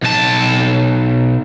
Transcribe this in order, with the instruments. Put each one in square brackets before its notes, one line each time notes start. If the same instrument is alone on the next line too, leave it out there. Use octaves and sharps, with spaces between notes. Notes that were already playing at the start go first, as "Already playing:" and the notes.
[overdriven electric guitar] B1 A5